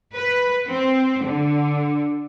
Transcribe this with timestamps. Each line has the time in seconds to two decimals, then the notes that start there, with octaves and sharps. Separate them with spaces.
0.13 B4
0.68 C4
1.25 D3